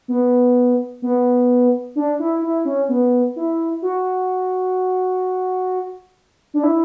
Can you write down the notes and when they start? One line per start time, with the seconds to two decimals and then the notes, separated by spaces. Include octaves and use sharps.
0.08 B3
1.02 B3
1.96 D4
2.19 E4
2.42 E4
2.65 C#4
2.89 B3
3.36 E4
3.82 F#4
6.54 D4
6.63 E4